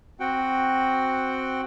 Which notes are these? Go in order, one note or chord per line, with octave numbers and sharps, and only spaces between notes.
C4 F#4 F#5 G5